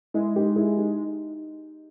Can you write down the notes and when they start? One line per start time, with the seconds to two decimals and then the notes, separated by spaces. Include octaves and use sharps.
0.14 G#3 E4
0.36 D#4 G4
0.56 E4 G#4
0.77 D#4 G4